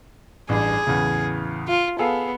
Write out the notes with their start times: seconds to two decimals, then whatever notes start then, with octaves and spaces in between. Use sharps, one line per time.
0.49 A1 G2 G#4
0.87 E2 A2 C#3
1.68 F4
1.99 B3 G#4 A4 F5